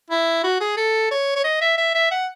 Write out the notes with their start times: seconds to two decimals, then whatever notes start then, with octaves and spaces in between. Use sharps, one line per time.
0.10 E4
0.44 F#4
0.60 G#4
0.77 A4
1.11 C#5
1.36 C#5
1.44 D#5
1.61 E5
1.78 E5
1.95 E5
2.11 F#5